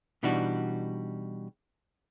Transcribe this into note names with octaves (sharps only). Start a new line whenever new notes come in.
B2 E3 G3 D4 D#4 F#4